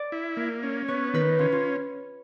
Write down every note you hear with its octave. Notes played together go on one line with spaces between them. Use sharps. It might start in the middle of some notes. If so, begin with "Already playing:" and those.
Already playing: D5
E4
A#3
C#4
B3 C#5
D#3 B4
C#4 F4
F4